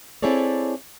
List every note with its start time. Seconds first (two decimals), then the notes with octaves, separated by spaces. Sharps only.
0.22 C4 E4 G#4 A4 C#5 D5